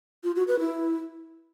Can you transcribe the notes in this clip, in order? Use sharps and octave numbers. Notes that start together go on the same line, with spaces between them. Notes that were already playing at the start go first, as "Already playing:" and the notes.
F4
F#4
B4
E4